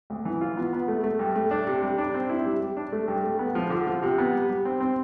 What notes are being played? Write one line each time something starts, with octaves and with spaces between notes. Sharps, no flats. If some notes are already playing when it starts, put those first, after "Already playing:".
D2
E3
F4
B3
B3
A3
A3
G2
A3
D4
C3
G3
D4
C4
E4
G3
G3
D4
A3
G2
A3
B3
F3
D3
F3
C3
B3
G3
G3
C4
C4